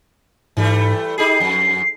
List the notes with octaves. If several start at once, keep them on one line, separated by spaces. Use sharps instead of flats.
G#2 E3 G3 A3
D#4 G4 G#4 C7
F2